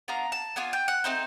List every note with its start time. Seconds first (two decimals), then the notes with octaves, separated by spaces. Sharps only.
0.08 B3 D4 F4 A#5
0.32 A5
0.56 B3 D4 F4 G#5
0.73 G5
0.88 F#5
1.04 A3 C4 D#4 C5